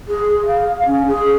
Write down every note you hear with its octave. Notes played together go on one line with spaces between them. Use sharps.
G#4
F5
C#4
G#4